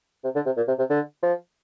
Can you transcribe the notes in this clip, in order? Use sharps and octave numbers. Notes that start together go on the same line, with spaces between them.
C3
D3
C3
A#2
C3
C3
D3
F3